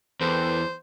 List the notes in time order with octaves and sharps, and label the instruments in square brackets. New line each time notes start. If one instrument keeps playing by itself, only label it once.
[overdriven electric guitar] E2 [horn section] A4 B4 G5 [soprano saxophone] C5